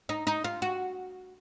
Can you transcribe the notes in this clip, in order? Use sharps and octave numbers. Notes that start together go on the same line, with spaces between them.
D#4
D#4
F4
F#4